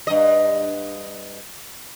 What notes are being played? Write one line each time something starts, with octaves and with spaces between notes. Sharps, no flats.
G2 D#5